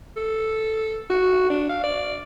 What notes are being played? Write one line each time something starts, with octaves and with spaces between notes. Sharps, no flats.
A4
F#4
D4
F5
D5